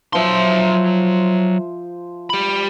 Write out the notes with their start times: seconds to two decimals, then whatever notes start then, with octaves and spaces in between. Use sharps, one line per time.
0.13 F3 F#3 C5 E5 C6
2.30 G4 B5